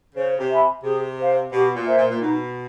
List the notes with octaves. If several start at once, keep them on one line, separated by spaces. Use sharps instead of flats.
C#3 C5
C3
E5 G#5 B5
C3 G#4
C5 F5
B2 G4
A#2
C5 E5 G#5
A#2
A#2
B2 D#4